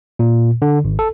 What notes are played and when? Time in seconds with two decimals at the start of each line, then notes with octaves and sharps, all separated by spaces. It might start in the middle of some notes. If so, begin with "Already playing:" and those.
0.19 A#2
0.62 D3
0.84 G#1
0.99 A4